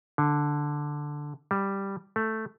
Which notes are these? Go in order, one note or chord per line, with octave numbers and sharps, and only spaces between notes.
D3
G3
A3